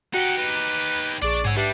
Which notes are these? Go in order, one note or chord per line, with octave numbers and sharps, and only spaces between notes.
D#4 F#4 G4 F#5 G5
B4 B6 E7
B5 G#6
A#1 D4 G#4 D5 C#6
G#2 G#4 C#5 F#5 E6
G3 D4 G4 B4 E5